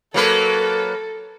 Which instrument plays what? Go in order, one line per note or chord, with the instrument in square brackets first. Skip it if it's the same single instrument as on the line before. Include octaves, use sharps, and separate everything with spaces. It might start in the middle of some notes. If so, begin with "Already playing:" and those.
[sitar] F#3 A#3 B4 [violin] A4